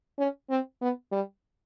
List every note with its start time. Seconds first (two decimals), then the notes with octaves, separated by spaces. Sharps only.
0.19 C#4
0.49 C4
0.81 B3
1.12 G3